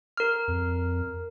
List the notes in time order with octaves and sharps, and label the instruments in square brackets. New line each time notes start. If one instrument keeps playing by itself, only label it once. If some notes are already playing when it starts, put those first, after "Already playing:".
[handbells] A#4 F6
[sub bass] F2